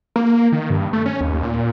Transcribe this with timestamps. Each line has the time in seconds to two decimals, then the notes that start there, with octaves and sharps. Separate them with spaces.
0.16 A#3
0.52 D#3
0.70 G2
0.93 A3
1.06 C#4
1.21 D#2
1.43 A#2